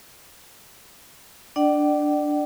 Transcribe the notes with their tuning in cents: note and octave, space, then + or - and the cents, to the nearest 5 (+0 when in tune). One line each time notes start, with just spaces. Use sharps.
D4 +0 D5 +25 G5 -45